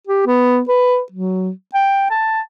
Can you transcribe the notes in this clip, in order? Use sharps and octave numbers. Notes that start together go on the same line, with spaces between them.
G4
B3
B4
F#3
G5
A5